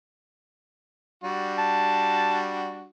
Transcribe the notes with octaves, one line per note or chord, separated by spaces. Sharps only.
G3 D4 F#4
A5